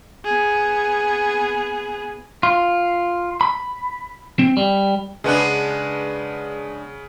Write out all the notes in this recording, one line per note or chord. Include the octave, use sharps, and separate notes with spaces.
B3 G#4
F4
B5
C4
G3
C#3 G#3 B3 D4 F#5 F#6